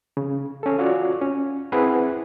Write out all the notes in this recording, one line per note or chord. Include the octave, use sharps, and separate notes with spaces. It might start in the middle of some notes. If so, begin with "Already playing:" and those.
C#3
C#4 A4
F4 F#4 C#5 D5
C#4
C4 E4 G#4 B4 F#5